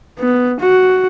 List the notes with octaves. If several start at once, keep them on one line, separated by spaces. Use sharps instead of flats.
B3
F#4